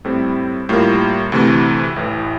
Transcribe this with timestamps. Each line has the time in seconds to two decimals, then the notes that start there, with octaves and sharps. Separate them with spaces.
0.05 A2 G3 C4 E4 A4
0.69 A2 G3 A#3 F4 A#4
1.32 D2 C3 E3 A3
1.96 A1 A2 E3